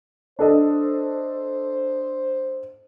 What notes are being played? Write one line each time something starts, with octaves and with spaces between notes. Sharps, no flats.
D4 A4 C5 D#5